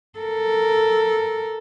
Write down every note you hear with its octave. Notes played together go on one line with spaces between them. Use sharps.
A4 A#4